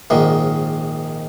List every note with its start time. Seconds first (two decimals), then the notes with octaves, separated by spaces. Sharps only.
0.10 A#1 G#2 D#3